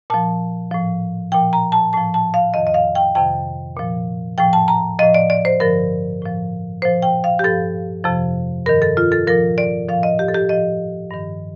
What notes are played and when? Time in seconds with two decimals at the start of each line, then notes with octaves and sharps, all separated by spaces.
0.10 A#2 F3 A5
0.71 A2 F3
1.32 A#2 F3 G5
1.53 A#5
1.72 A5
1.93 A2 F3 A5
2.14 A5
2.34 F5
2.54 F2 D#3 D#5
2.67 D#5
2.74 F5
2.95 G5
3.15 F2 C3 D#3 G5
3.77 A#2 F3
4.38 A2 F3 G5
4.53 A5
4.68 A#5
4.99 A2 F3 D#5
5.15 D5
5.30 D5
5.45 C5
5.60 G2 D3 F3 A#4
6.22 A2 F3
6.82 A#2 F3 C5
7.02 G5
7.24 F5
7.39 G4
7.44 G2 F3 A4
8.04 F2 C3 F3
8.66 G2 D#3 A#4
8.82 A4
8.97 F4
9.12 A4
9.27 A#2 F3 A#4
9.58 D5
9.89 A2 F3 F5
10.03 D#5
10.19 G4
10.28 A4
10.34 G4
10.49 A2 F3 D#5
11.10 G2 D#3